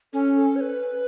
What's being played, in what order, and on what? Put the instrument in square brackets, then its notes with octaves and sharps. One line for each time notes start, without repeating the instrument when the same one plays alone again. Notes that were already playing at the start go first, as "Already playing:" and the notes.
[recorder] C#4 [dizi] A4
[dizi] A4
C#5
B4